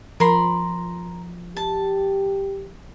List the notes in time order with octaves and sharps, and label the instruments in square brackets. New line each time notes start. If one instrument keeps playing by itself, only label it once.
[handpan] F3 [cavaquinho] A#4 B5 C6
[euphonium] G4 [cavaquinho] A5